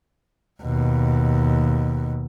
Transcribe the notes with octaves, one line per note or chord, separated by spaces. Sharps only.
D#2 B2